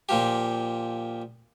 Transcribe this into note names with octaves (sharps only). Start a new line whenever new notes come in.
A#2 F3 G4